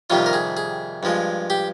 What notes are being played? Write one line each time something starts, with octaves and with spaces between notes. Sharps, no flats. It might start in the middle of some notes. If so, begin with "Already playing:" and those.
F2 C3 D#3 G3 F4
A#4
G#4
G#4
G2 F3 G#3
G4